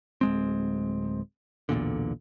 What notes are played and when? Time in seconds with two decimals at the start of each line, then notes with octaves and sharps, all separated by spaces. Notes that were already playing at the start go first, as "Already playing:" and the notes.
0.21 D1 G#3 C4
1.69 B1 E2 A#2 D3